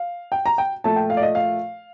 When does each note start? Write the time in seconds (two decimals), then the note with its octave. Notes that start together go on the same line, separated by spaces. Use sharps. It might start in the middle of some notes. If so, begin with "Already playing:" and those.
Already playing: F5
0.32 G5
0.46 A#5
0.58 G5
0.84 A#2 F3 A3 A5
0.96 G5
1.10 F5
1.17 D5
1.22 D#5
1.35 F5